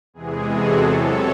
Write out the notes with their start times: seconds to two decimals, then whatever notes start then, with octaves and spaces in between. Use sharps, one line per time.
0.14 E2 C3 E3 G#3 G#4
0.47 F#4 A4
0.81 C3 F#3 A4 C#5